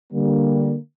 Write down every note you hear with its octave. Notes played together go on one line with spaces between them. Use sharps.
D3 G3 A#3